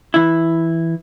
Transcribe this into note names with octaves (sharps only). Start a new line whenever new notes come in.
E3 E4